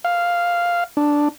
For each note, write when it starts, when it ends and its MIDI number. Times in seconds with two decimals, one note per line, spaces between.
0.05 0.84 77
0.97 1.28 62